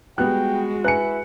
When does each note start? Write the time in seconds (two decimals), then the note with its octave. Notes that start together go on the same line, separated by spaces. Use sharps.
0.18 G3 G#3 B3 F#4 G5 F#6
0.84 E4 B4 G#5 F#6 C#7